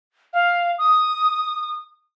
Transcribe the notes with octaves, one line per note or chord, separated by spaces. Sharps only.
F5
D#6